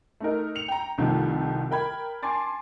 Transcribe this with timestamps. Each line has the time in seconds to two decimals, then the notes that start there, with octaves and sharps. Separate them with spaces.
0.20 A3 D#4 A#4
0.55 C#7 F7
0.68 G5 A#5
0.98 C2 D#3 F3 A3
1.71 A#4 G5 B5 G#6
2.23 G#5 A5 C6 D6 A6